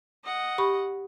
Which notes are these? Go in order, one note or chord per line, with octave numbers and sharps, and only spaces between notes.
D#5 F#5
G4 B5 C#6